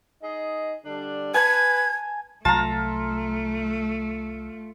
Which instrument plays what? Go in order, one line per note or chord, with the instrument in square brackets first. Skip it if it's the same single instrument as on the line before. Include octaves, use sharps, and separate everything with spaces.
[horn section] D#4 G#4 D#5
D3 G3 D4
[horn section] B4 [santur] G#5 A5 [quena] G#6
[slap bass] C2 F#3 [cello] A3 [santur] F4 [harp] A5 A#5